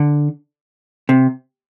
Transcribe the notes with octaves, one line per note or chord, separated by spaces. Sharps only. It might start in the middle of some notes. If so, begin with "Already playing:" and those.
Already playing: D3
C3